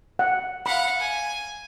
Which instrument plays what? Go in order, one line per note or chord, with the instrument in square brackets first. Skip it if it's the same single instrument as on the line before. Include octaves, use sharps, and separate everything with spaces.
[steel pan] F#5
[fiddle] F5 F#5 [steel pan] B5
[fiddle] G#5